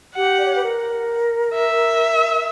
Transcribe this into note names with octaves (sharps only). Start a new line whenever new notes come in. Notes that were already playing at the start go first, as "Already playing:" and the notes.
G4 F#5
D5
C#5
B4
A#4
E5